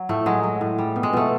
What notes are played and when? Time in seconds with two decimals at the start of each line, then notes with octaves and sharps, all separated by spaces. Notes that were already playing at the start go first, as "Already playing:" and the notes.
Already playing: F#3
0.09 A2 A3
0.26 F#3 G#3
0.43 F#3
0.61 A2
0.78 G3
0.96 B2
1.03 G#3
1.13 B2 A3